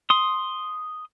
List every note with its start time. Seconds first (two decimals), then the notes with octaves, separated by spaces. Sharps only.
0.10 C6 D#6